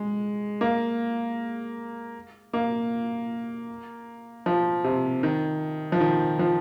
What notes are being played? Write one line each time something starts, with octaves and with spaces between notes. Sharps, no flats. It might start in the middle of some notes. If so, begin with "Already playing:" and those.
Already playing: G#3
A#3
A#3
F3
C3
D#3
F3
D#3
F3